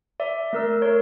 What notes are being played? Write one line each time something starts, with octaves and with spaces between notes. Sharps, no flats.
D5 E5
A3 A#4 E6
A#4 C#5